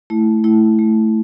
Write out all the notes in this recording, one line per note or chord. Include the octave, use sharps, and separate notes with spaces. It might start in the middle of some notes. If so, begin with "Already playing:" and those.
A3 E4
A3 E4
A3